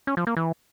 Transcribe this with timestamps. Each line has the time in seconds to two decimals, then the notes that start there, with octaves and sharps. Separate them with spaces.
0.07 C#4
0.17 F3
0.27 A#3
0.37 E3